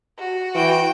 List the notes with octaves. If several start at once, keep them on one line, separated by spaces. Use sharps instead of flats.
F#4
E3 G5